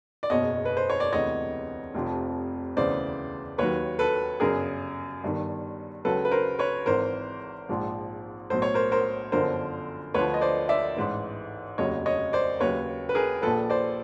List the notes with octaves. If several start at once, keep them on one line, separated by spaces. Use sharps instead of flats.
D5
F#1 E2 B2 C#5 D#5
B4
C5
C#5
D5
E1 D2 C3 E3 C#5 D#5
F1 F2 C3 F3
E1 D2 C#3 E3 C5 D5
D#2 D#3 F#3 B4 C#5
A4 B4
G1 F#2 C#3 G#4 A#4
G1 G2 D#3
C#2 C#3 F#3 A4 B4
B4
A#4 C5
B4 C#5
G#1 G#2 E3 A#4 C5
A#1 G#2 F3
B1 A2 F#3 C5
C#5
A#4 C5
A#4 C5
G1 F#2 D3 F3 A#4 C5
D2 D3 F3 B4 C#5
D#5
C5 D5
D5 E5
A1 G#2 E3
F1 D#2 C#3 F#3 C#5 D#5
C#5 D#5
C5 D5
D#2 C#3 F#3 B4 C#5
B4
G#4 A#4
A#1 A#2 F3 A4 B4
C5 D5